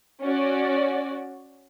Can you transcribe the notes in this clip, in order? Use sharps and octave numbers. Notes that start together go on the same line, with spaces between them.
C#4 F#4 D5